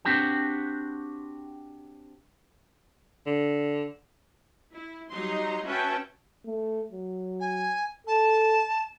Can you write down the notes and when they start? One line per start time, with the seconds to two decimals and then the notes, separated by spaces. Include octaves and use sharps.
0.05 C4 D4 F#4 G4 G5
3.26 D3
4.74 E4
5.10 F#3 G3 D#4 A#5 C6
5.67 C#4 F#4 B4 E5 G5 A5
6.46 A3
6.92 F#3
7.40 G#5
8.07 A4 A5